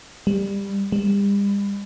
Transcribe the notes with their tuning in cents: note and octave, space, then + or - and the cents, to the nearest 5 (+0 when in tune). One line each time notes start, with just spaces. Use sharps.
G3 +20
G3 +40